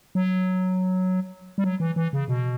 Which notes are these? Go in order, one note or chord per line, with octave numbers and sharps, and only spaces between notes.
F#3
G3
F#3
E3
E3
C#3
B2